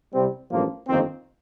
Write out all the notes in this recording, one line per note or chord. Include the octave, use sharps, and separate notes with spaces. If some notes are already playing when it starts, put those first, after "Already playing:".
C2 C3 G3 C4
A1 G2 F3 A#3
G1 F2 D#3 A#3 C4